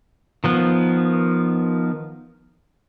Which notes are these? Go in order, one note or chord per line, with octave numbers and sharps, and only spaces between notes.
D#3 F3 B3